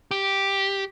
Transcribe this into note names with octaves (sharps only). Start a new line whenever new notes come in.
G4